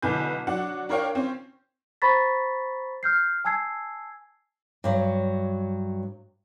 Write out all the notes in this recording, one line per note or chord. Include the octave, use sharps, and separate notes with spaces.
B1 D3 E3 B4 G#5 G6
F#3 D4 F#5
D4 A#4 C#5 F5 G5
C4 C#4
C5 A#5 B5 C#6 A6 B6
F6 G6 C7
G#5 A5 E6 G#6 C7
G2 F#3